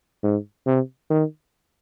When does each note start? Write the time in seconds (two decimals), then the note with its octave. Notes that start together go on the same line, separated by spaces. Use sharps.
0.23 G#2
0.66 C3
1.10 D#3